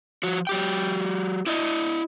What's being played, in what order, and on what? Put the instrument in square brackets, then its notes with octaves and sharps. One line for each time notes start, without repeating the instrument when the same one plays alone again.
[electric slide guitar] F3 F#4
F#3 G4 G5
E4 D5 D#5